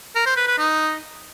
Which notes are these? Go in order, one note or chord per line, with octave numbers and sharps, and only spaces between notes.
A#4
C5
B4
B4
D#4